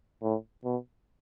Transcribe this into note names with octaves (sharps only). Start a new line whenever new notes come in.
A2
B2